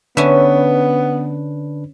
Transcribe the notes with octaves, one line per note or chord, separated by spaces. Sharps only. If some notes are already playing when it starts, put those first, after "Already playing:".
D3 B3 C#4 D4 B4 E5